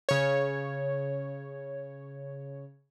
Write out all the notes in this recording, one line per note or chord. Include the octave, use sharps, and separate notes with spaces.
C#3 C#5